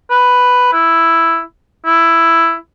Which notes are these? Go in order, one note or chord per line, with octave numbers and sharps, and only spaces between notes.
B4
E4
E4